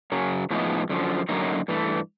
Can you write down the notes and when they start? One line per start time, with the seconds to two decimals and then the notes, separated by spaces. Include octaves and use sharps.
0.12 F#2 C#3 F#3
0.50 A2 F3 G#3 B3 D#4
0.89 F#2 D3 F3
1.29 F#2 D3 F#3 A#3 D#4
1.68 G2 E3 A3